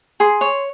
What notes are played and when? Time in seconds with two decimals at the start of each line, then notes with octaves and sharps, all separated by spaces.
0.20 G#4 C6
0.41 C#5